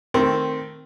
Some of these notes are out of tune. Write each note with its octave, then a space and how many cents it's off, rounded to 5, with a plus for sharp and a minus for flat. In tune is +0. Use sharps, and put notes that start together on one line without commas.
D#3 +0 A3 +0 C4 +0